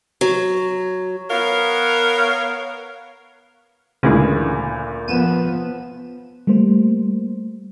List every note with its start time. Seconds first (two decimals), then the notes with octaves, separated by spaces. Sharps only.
0.21 F#3
1.31 B3 A#4 C#5 F5
4.03 D2 A#2 C#3 E3 G#3
5.08 F3 B3 D#7 E7
6.47 G3 A3 A#3 C5